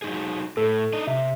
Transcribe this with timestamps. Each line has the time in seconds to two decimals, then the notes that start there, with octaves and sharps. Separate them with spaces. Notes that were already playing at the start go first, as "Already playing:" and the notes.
0.02 F#3 D#4 G#4
0.57 A2 A4
0.93 D4 D#4 D#5
1.07 C3 E5